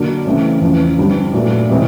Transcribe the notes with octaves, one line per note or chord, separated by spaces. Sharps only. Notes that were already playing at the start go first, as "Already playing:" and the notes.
Already playing: D3 F#3 A#3
C#3 E3 A3 C4
E2 C#3 F3
G2 D3 G3 C4
A#2 F#3 A3
C3 E3 G#3 C4